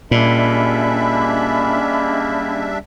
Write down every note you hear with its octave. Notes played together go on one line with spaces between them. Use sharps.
A#2 G3 G#3 A#3 C#4 D4 E5 B5